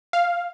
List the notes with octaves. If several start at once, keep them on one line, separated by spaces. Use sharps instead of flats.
F5